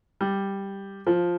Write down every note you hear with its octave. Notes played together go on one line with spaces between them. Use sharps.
G3
F3